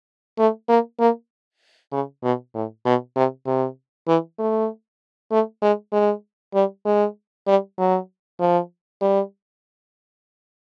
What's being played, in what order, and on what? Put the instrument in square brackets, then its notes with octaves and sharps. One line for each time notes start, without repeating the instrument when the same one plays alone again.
[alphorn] A3
A#3
A#3
C#3
B2
A2
B2
C3
C3
E3
A3
A3
G#3
G#3
G3
G#3
G3
F#3
F3
G3